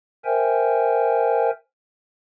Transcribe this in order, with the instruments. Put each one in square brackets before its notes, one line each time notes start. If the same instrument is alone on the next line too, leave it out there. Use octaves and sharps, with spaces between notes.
[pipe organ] A#4 C5 E5 G5 G#5